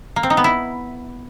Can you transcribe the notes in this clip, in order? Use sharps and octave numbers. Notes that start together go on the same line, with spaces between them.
A#3
C4
D#4
B3
E4